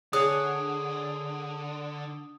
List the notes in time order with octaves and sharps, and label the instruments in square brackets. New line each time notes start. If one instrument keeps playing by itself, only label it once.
[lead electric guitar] D3 [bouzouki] G#4 C#5 F#5 [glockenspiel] D#6